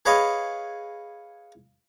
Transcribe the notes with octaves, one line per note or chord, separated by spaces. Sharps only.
G#4 B4 C#5 D#5 F5